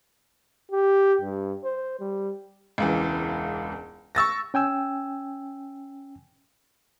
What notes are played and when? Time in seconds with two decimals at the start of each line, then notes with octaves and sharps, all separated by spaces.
0.72 G4
1.21 G2
1.64 C5
2.00 G3
2.78 E1 C#2 E3
4.15 C#6 E6 A6 A#6
4.54 C#4 G5 G#5 E6